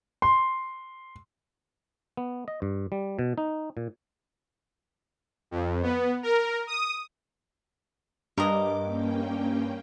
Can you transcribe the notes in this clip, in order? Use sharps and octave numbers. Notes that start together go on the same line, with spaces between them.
C6
B3
D#5
G2
G3
B2
D#4
A#2
F2
B3
A#4
D#6
G2 A#4 D#5 D6
A#3 C#4 G5